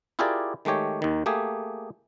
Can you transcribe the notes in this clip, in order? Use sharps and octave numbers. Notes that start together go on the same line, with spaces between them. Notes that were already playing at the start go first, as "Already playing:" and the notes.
E4 F4 G4 G#4 A#4 D5
D#3 G#3 A3 G4 C#5
D#2 D#3
A3 A#3 G4 G#4